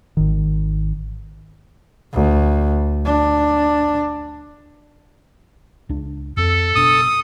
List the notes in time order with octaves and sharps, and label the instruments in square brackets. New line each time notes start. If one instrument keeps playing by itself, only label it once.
[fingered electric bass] G#1 D#3
[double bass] D2
D4
[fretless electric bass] C#2 D4
[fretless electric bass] F2 C4 [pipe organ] A4
[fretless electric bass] F#1 B2 D4 [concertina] D#6